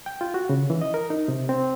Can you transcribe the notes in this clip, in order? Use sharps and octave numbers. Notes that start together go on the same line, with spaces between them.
G5
F4
F#4
C#3
E3
D#5
A#4
D#4
C3
C4